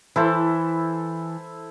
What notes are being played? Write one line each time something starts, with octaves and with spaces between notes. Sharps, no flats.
E3 E4 A4 C5